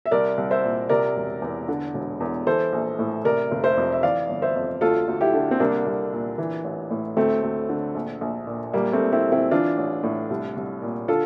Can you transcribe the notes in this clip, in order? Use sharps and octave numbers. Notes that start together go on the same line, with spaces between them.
E5
C2 A#4 D5
C2
C5 E5
A#2
C3 A#4 D5
E1
E2
D3
E1
E2
E3 A4 C5
A#1
A2
C3 A#4 D5
F1
C5 E5
F2
E5
E3 D5 F5
G1
C5 E5
F2
D2 F4 A4
D2
E4 G4
D3
C4
C2 A#3 D4
C2
A#2
E3
A1
A2
D2 A3 C4
D2
D3
A#1
A#1
A#2
A#1 G3 A#3
A3 C4
A#1
C4 E4
A#2
C4 E4
E3 D4 F4
A1
A2
C2
C2
A#2
D3 F4 A4